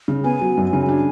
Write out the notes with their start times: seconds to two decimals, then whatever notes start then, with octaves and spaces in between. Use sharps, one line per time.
0.08 C#3
0.24 B3 G#5
0.41 F#3
0.57 F#2
0.73 C#3
0.88 D4 G#5